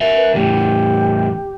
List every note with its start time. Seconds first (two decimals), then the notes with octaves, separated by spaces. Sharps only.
0.01 A#4 E5
0.16 B4
0.34 E2 A2 G4